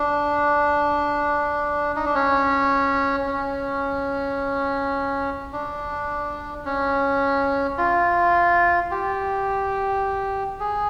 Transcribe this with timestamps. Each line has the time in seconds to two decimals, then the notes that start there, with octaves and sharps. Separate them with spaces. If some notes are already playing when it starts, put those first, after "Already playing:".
Already playing: D4
1.96 D#4
2.06 D4
2.15 C#4
3.27 C#4
5.53 D4
6.65 C#4
7.78 F4
8.91 G4
10.60 G#4